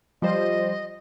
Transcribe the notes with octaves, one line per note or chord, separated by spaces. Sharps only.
F3 G3 C5 D#5